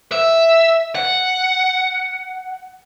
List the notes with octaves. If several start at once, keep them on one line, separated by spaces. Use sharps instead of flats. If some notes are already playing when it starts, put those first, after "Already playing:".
E5
F#5